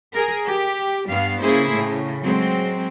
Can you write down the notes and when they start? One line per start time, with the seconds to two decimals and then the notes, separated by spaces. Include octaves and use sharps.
0.13 G#4 A#4
0.46 G4
1.08 G2 G3 B3 F5
1.43 C#3 A#3 E4 G#4 C5
1.73 A2 C#3
2.23 F#3 G#3 C4